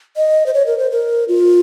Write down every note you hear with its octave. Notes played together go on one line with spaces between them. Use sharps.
D#5
C5
C#5
A#4
C5
A#4
F4